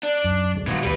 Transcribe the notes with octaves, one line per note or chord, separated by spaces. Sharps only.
D4
F#2
D2 G#3 A3
B2 D#3 E3 G3 F#4
D#1 D#2 G3 B4